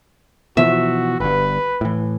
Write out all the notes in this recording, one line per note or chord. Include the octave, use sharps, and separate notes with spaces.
B2 E3 F3 F#4 E5
G1 G2 B4
A2 E3